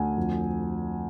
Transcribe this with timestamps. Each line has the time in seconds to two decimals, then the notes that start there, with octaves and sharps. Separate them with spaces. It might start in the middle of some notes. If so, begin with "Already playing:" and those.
Already playing: D2 G#5
0.17 F2